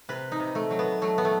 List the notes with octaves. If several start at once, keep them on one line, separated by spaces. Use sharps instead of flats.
C3 B4
D#4
C3
A3
F#3
B3
F#3 A3
B3
A3